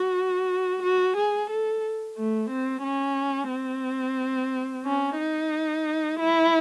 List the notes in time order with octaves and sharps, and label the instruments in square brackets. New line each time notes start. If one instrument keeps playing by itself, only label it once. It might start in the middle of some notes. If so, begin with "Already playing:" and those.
Already playing: [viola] F#4
F#4
G#4
A4
A3
C4
C#4
C4
C#4
D#4
E4